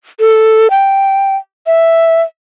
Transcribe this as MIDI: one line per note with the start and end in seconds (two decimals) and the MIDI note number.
0.20 0.68 69
0.71 1.36 79
1.67 2.22 76